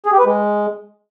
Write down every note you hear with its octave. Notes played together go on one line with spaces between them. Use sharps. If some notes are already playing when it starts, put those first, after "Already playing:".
G#4
G4
B4
G#3